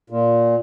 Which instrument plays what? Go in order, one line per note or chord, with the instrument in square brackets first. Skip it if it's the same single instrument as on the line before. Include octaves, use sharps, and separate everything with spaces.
[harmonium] A#2